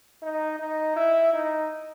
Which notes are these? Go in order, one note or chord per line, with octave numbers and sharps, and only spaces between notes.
D#4
D#4
E4
D#4